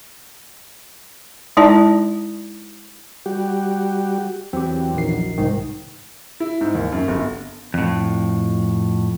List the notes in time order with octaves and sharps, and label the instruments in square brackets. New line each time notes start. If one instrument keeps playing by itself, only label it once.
[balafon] G#3 D#4 E4 D5 A5
[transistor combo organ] G3 F#4 G4
[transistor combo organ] E2 F#3 [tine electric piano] C4 G4
[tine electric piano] A#1 D#3 C7
C2 G#2 D#3
[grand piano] E4
G#2
D#2
F#2
G1
[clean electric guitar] F2 A2